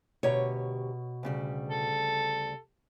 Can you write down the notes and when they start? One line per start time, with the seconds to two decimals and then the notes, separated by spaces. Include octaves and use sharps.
0.23 D2 B2 G4 C#5 A#5
1.23 D2 C#3 G3
1.69 A4